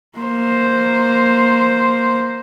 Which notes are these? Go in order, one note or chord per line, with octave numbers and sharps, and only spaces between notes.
A#3 C5